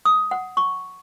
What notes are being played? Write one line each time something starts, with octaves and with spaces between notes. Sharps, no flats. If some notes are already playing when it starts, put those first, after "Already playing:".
D#6
F#5
C#6